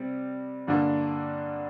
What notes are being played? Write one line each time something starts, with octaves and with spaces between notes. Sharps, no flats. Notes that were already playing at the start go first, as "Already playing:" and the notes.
Already playing: C3 G3 C4
G2 D3 G3 A#3 D4